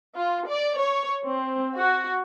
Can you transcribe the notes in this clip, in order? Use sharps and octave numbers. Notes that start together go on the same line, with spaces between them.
F4
D5
C#5
C4
F#4